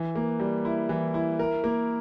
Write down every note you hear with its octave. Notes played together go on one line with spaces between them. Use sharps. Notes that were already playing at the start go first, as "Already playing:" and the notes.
Already playing: E3
A#3
G3
E4
E3
E4
A#4
A#3